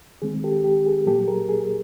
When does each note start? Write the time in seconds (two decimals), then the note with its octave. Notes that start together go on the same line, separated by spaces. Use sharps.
0.22 D#3 G#3 C4 G#4
0.44 G4 A4
0.64 G4
0.86 G#4
1.06 A#2 F#3 A#3 G4 A4
1.28 G#4 A#4
1.49 G#4